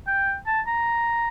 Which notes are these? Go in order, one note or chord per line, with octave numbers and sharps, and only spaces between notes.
G5
A5
A#5